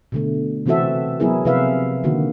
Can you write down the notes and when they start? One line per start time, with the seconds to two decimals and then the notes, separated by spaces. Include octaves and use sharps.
0.12 B2 D3 A3
0.66 C3 E3 C4 F#4 A4 E5
1.20 F#3 B3 E4 G#4 A#4
1.45 C3 F3 E4 B4 E5 F5
2.04 D3 D#3 A#3 F#4